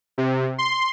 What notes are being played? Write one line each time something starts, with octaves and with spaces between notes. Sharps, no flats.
C3
C6